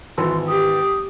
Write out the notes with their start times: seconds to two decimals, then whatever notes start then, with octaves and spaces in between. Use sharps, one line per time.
0.18 G#1 E3 C6 E6
0.48 G4 D#6